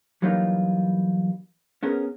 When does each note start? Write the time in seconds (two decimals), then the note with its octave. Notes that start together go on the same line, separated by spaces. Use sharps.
0.22 E3 F#3 G3 A#3 D#4 F4
1.83 B3 C#4 G#4 A#4